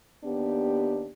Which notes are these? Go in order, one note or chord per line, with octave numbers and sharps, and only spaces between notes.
D#2 B3 D4 G4